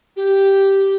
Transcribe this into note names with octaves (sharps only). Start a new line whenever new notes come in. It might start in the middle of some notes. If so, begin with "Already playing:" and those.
G4